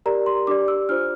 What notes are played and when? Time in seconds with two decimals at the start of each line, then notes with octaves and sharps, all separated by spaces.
0.06 G4 A#4 D5 A#5
0.26 C6
0.47 D4 G4 D5 D6
0.68 E6
0.89 D4 F4 C5 F6